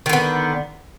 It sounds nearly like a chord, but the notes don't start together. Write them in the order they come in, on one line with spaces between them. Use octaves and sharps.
D#3 D3 B3